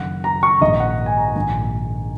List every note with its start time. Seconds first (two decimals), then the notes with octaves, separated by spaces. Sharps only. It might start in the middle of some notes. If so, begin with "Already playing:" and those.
Already playing: F#1 F#2 D#3 F#5
0.24 A#5
0.43 C#6
0.61 A#1 G#2 D#3 D#5
0.80 F#5
1.06 G#5
1.17 A#5
1.36 A#1 G#2 D#3 G#5